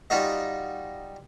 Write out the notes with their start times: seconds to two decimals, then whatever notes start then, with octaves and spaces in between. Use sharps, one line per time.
0.10 G3 D#4 F4 F#4 D#5